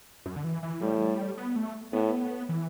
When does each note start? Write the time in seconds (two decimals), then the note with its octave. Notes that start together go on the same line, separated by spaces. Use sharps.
0.26 F#2
0.36 D3
0.44 E3
0.63 E3
0.81 A2 G3
1.37 B3
1.56 A3
1.93 A2 B3
2.49 E3